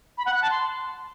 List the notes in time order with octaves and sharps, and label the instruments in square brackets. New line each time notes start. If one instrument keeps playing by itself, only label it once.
[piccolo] B5
F#5
F#6
A5
C6